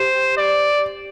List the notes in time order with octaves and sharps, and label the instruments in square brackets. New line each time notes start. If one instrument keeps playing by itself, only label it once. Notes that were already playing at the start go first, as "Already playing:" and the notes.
Already playing: [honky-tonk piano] G4 [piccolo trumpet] C5
[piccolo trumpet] D5